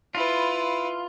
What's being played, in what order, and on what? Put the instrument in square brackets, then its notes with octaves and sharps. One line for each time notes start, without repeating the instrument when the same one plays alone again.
[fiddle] E4 B4 [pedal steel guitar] F4